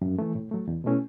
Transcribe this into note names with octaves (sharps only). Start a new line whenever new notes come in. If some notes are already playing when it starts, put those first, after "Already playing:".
F#2
E3 A3
A2
F#3 A3
E2
B2 A3 C#4 E4